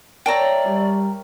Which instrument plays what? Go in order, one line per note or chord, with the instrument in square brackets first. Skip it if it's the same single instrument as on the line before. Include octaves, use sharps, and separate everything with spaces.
[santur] A#4 C#5 E5 [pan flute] D5 [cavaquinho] G5 A5 A#5
[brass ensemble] G3 [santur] G4